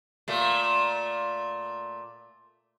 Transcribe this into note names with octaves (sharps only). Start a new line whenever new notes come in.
A#2 A3